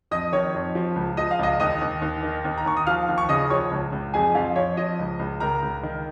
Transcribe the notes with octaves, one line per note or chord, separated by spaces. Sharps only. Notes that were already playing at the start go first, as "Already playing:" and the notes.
F2 D#5 D#6
D#3 C#5 C#6
F2
F3
C#2
F3 D#5
F5
C#2 D#5
D#2 D#5 D#6
D#2
D#2
D#3
D#2
A#5
D#2 C#6
D#6
F3 F5 F6
D#2
C#6
C#3 D#5 D#6
F3 C#5 C#6
C#2
C#2
F2 G#4 G#5
F2 F4 F5
F2 C#5
F3 D#5
C#2
C#2
C#2 A#4 A#5
C#2
D#3